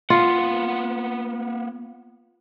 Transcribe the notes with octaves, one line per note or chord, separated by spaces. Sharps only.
A#3 B3 F4 F#5